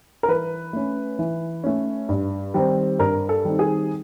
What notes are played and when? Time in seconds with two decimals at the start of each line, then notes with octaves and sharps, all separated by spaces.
0.23 A#4
0.28 E3 B4
0.73 A3 C#4
1.19 E3
1.64 A3 C#4
2.09 G2
2.54 D#3 G3 C4 D#4
2.99 G2 A#4
3.29 A4
3.45 D#3 G3 C4 D#4
3.59 G#4